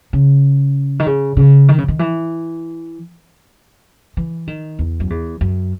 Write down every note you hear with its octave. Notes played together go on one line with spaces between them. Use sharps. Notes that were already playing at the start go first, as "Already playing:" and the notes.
C#3
D#3
C#3
C#3
D#3
C#3
D#3
E3
E3
D#3
E2
F#2
E2
F#2